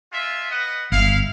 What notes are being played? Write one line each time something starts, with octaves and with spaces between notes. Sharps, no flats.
G#3 F4 E5
B4 D#5 F#5
G1 E4 F5